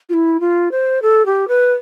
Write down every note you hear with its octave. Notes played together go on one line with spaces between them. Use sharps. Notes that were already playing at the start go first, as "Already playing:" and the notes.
F4
E4
F4
C5
A4
G4
B4